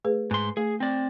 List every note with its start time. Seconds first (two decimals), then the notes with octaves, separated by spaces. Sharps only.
0.05 A3 G#4 B4
0.31 G#2 C6
0.57 A3 G#4
0.80 C4 D5